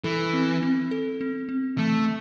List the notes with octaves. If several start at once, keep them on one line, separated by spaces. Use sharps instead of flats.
E3 A4
C4
C4
A4
C4
C4
E3 A3